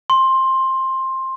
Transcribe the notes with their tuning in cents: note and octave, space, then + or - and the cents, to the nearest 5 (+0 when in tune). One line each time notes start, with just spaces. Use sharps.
C6 +15